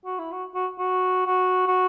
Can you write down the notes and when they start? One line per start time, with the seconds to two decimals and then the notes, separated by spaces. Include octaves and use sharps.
0.05 F#4
0.19 E4
0.32 F#4
0.55 F#4
0.79 F#4
1.26 F#4
1.67 F#4